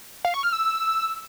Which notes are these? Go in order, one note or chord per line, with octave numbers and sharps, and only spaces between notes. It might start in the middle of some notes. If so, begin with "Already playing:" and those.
F5
C#6
F6
E6